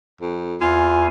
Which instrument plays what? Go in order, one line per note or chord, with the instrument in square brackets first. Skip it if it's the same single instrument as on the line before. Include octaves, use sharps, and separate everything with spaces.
[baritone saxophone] F2
[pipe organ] E2 G#5 [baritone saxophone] F4